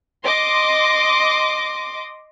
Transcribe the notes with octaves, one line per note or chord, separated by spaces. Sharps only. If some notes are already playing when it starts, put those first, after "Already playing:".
D#5 C6 D6